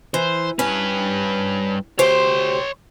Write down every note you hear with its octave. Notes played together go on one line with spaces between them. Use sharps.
E3 C5
G2 C#4 B4
D2 G4 C5 C#5 C6